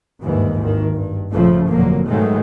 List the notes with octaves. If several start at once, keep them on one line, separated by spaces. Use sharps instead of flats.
G1 D#2 G#2 D#3 E3
G#1 D#3
G2
A#1 F2 C#3 F3 A3
F1 B2 D3 F3 F#3 A#3
G#2 B2 D#3 F#3 G#3 A3